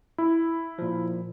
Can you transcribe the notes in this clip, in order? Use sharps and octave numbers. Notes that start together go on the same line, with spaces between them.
E4
A#2 F3